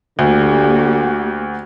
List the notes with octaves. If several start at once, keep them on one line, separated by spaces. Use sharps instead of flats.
D2 D3 A#3 F#4 G4